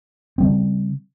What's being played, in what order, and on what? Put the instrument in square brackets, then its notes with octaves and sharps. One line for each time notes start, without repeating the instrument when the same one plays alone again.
[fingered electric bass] C#3 G3 C4